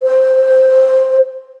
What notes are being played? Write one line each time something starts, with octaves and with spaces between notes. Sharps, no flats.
C5